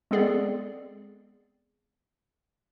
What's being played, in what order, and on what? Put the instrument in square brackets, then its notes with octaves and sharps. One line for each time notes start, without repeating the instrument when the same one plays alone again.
[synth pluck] G#3 B3 C4 G#4 A4 D5